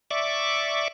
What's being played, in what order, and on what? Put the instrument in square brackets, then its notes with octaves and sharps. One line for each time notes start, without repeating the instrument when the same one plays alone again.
[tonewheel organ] D5 E5 C#6 D6